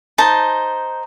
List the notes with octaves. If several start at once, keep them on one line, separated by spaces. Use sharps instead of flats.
D#4 C5 A5